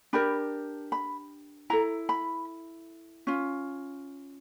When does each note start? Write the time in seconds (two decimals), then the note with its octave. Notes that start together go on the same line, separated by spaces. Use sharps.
0.13 D4 G4 A#4 B5
0.92 B5
1.70 E4 A4 A#5
2.09 B5
3.27 C#4 F4